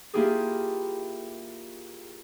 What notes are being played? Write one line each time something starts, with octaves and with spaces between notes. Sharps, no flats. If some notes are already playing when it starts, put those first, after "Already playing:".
A#3 E4 F4 G4 G#4